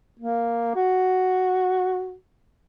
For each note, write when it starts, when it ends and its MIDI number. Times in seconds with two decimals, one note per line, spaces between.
0.20 0.70 58
0.75 2.14 66